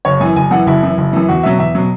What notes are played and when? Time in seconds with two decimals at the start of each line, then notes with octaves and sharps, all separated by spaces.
0.05 F#1 C#5
0.21 F#2 E3 G#5
0.36 F#1 G#5
0.51 F#2 E3 F#5
0.67 F#1 E4
0.83 F#2 E3
0.98 F#1
1.13 F#2 E3
1.28 E2 F#4
1.43 B2 F#3 E5
1.59 E2 E5
1.75 B2 F#3